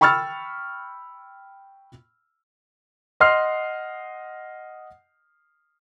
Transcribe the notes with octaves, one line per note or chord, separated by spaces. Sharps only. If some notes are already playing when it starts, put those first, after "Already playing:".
G5 B5 C#6 E6 F6 A6
D#5 F#5 C6 F6 C7